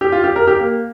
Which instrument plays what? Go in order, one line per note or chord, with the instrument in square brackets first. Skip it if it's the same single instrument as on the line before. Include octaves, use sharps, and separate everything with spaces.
[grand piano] G4
F4
G4
A#4
G4
A#3